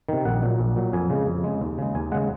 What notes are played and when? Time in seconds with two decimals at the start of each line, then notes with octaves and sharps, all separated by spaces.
0.09 C3 D#3
0.25 A#1 F#5
0.42 A#2 F#3
0.59 A#1
0.76 A#2 F#3
0.93 F2 G#5
1.10 C#3 G#3
1.27 F2
1.44 C#3 G#3
1.61 D#2
1.78 C#3 G#3
1.95 D#2 G#5
2.12 C#3 G#3 F#5